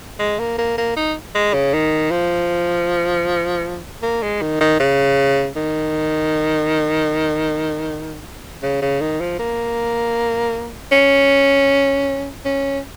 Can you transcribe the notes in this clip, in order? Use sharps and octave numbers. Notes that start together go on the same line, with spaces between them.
G#3
A#3
A#3
A#3
D#4
G#3
C#3
D#3
F3
A#3
G#3
D#3
D#3
C#3
D#3
C#3
C#3
D#3
F3
A#3
C#4
C#4